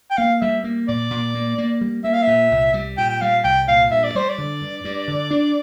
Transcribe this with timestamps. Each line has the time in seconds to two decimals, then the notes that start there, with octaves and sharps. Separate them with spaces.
0.11 G5
0.18 A#3 F5
0.41 G3 E5
0.64 A#3
0.88 A#2 D5
1.11 A#2
1.35 A#3
1.58 A#3
1.81 G3
2.04 A#3 E5
2.14 F5
2.22 A#2 E5
2.51 C2
2.74 G3
2.98 A#2 G5
3.10 G5
3.21 G3 F5
3.44 C2 G5
3.68 A#2 F5
3.91 G2 E5
4.04 D5
4.15 G3 C5
4.29 D5
4.38 D3
4.61 G2
4.84 G2
5.08 D3
5.31 D4